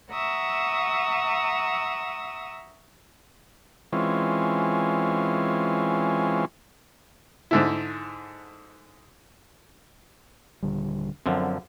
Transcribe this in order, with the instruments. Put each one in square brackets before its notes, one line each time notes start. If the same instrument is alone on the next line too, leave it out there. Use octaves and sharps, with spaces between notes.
[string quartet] E5 F#5 A#5 C#6 D#6 E6
[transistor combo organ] E3 G#3 C4 C#4 F4
[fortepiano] G#2 D3 E4
[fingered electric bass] D#1 D3 G3
[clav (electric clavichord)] F#2 D3 F3 [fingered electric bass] F#3 C4